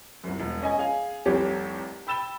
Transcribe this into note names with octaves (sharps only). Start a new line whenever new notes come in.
C2 F#2
E1
C#4 D#5 G#5
G#4 F5 G#5
F1 C2 G4 C#5
G5 B5 E6 A6 E7 G7